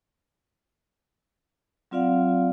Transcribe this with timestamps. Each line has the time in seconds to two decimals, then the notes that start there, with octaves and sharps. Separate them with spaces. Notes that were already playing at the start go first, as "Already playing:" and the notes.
1.91 F#3 C4 F4 D5 F5 F#5